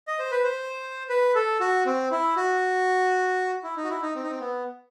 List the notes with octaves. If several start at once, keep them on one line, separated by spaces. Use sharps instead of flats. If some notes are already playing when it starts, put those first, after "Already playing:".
D#5
C5
B4
C5
B4
A4
F#4
C4
E4
F#4
E4
D#4
F#4
E4
D#4
C4
D#4
C4
B3